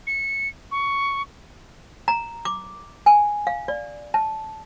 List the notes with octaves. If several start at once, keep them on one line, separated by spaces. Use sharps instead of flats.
C#7
C#6
A#5
D6
G#5
F5
D5
A5